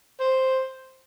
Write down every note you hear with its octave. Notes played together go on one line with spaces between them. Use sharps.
C5